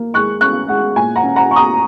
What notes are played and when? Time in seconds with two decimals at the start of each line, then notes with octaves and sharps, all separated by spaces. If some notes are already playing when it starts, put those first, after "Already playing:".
Already playing: A#3
0.14 G#3 C#6 F#6
0.41 C#4 C#6 F#6
0.68 G#3 F#5
0.96 A#2 G#5
1.16 F#5 A#5
1.23 C#4
1.36 F#5 A#5
1.50 C#4 C#6
1.56 A#5 D#6